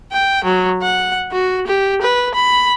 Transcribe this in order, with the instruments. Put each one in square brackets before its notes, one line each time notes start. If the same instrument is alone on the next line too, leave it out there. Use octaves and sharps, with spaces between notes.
[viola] G5
F#3
F#5
F#4
G4
B4
B5